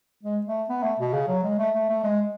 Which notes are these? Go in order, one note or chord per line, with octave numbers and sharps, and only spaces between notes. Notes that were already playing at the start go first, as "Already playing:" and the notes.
G#3
A3
B3
A3
B2
C#3
F#3
G#3
A3
A3
A3
G#3